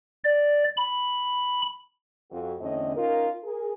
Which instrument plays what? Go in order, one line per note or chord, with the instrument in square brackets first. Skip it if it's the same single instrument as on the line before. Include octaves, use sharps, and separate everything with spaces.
[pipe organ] D5
B5
[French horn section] F2 F#4
E2 A2 D3 C4 C#4 D#5
C#4 D#4 F4 A#4
G#4 A#4